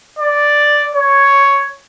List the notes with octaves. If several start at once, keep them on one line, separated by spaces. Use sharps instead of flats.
D5
C#5